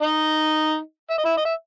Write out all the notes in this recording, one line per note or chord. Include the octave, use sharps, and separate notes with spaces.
D#4 D#5
E5
D#5
E4 E5
D#5
E5